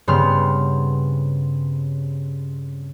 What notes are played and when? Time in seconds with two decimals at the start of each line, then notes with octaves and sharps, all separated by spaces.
0.07 G2 C#3 B3 C4 C6 F6